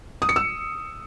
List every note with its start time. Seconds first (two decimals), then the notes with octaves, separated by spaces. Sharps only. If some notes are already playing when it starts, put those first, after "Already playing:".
0.22 D#6
0.29 C#7
0.36 E6